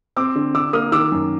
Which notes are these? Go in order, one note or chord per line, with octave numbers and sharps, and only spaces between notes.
C4 D6 E6
D3
D3 D6 E6
A#3 D#6 F6
D#3 D6 E6
F#2